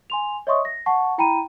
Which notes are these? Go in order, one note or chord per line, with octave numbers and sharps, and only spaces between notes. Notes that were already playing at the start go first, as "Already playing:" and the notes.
G#5 C6 F7
C#5 D#5 E5 C6 C#6 D#6
A#6
F#5 A5 C#6
E4 G5 A#5 B5 D#7